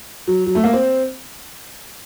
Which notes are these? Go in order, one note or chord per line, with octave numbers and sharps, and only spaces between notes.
F#3
F#3
A3
A#3
C4